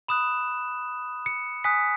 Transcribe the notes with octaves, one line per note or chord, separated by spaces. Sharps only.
B5 D#6 F#6 E7
C#7
G#5 D#6 F#6 B6